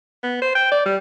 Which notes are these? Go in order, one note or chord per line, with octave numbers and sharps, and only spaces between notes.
B3
C5
G5
D5
G3